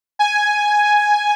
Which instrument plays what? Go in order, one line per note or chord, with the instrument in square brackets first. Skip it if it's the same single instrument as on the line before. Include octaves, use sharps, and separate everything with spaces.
[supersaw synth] G#5